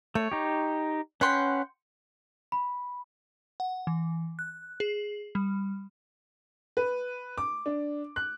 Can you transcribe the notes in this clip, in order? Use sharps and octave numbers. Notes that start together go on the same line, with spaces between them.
A3 C#5
D#4 G4
C#4 B4 F#5 G5 C6
B5
F#5
E3
F#6
G#4
G3
B4
D6
D4
F#6